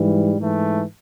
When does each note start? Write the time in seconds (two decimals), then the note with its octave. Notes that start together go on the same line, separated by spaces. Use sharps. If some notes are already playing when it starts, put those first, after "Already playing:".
Already playing: G#2 E3 G3
0.37 G#2 E3 A3